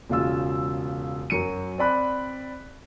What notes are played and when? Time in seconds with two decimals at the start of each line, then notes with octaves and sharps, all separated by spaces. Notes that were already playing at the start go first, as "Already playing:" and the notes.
0.10 E1 C#3 F4 E6
1.30 F#2 F#3 C#7 D#7
1.78 C4 D5 B5 F#6